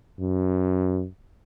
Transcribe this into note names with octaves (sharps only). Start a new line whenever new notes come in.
F#2